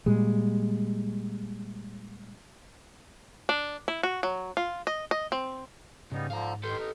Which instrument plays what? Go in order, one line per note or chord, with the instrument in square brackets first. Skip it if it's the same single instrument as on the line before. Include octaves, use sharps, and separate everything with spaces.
[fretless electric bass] A#2 G3 G#3
[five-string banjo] D4
E4
F#4
F#3
F4
D#5
D#5
C4
[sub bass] G#2 [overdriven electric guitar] C#3 [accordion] G3 B3 D#4
[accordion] D3 F3 [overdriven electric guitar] F5 A#5
[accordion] D#3 C6 G6 [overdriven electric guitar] A4 B4
[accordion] D#4